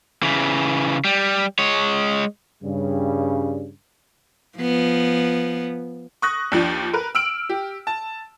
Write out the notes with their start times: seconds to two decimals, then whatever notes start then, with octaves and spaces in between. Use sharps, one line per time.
0.22 C#3 E3
1.05 G3
1.59 G#3 C#5
2.63 G2 C#3 G3
4.58 F3 B3
6.22 C#6 D#6 F#6 A#6
6.52 D#2 F3 D4
6.94 A#4 B4
7.15 E6 F6 D7 F#7
7.49 G4
7.87 A5